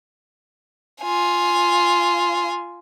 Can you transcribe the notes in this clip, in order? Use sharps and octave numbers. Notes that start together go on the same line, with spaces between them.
F4 G#5